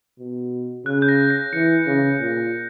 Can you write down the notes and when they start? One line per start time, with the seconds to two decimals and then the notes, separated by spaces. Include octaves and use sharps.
0.19 B2
0.85 C#3 F#6
1.02 G6
1.09 A#6
1.30 A#6
1.53 E3 C#7
1.86 C#3
2.19 A#2